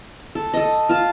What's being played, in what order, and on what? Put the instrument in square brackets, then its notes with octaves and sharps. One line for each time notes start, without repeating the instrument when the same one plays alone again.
[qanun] A4
A4 D#5
F4 A5